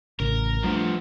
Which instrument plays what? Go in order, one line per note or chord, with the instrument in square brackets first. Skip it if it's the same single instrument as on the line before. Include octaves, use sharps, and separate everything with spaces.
[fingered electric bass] A1 C#3 E3 [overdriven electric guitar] A#4
[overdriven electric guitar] F3 B3 [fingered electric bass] G3 A3 D4